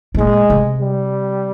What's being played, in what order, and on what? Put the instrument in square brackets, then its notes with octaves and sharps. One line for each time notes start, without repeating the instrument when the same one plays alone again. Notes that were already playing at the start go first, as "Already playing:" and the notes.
[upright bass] C3
[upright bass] A#2 [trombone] G#3
[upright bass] C3
[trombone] G3